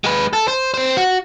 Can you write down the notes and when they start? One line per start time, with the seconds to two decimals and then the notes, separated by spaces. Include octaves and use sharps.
0.04 G#3 B4
0.33 A4
0.48 C5
0.74 C4 C5
0.97 F#4